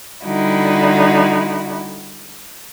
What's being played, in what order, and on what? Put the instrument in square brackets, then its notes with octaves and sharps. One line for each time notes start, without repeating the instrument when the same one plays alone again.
[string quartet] D3 G3 D#4 E4 F#4